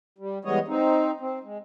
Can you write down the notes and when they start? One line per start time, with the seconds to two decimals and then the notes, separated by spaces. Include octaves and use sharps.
0.18 G3
0.45 E3 G3 G#3 B3 C#5 D#5
0.68 C4 D#4
1.20 C4
1.44 G#3